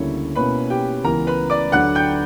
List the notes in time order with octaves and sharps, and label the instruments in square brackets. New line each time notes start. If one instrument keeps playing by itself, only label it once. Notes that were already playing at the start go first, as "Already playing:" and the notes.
Already playing: [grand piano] D2 C#3 G3 A#3 E4 [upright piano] C#5
[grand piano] B2 A#3 C#4 E4 [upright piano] B4 B5
[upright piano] G4 G5
[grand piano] C#2 C#3 E3 B3 [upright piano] A#4 A#5
[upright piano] B4 B5
D5 D6
[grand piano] D2 D3 F#3 [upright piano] F#5 F#6
[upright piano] G5 G6